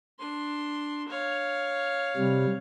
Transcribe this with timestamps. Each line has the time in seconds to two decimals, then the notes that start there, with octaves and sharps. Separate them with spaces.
0.20 D4 C6
1.08 C#5 F5
2.16 C3 G3